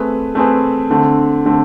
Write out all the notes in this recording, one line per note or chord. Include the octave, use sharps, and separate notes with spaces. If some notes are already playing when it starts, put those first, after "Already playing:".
Already playing: A3 C4 G#4 B4
A3 C4 G#4 B4
D3 A3 C4
D3 A3 C4